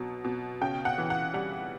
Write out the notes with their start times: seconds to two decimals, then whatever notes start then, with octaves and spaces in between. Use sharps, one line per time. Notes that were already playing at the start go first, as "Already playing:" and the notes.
Already playing: B2 F#3
0.24 B2
0.61 C#3 G5
0.85 F#5
0.98 E3
1.10 F#5
1.33 G3 F#5